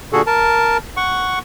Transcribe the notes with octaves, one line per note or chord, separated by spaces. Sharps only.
A#2 D3 F#4 G#4 A4
A#4 A5
F#5 C#6